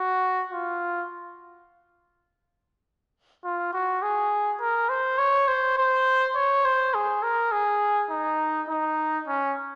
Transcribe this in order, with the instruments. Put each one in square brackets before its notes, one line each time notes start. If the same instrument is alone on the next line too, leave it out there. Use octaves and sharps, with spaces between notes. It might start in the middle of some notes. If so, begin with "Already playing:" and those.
Already playing: [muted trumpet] F#4
F4
F4
F#4
G#4
A#4
C5
C#5
C5
C5
C#5
C5
G#4
A#4
G#4
D#4
D#4
C#4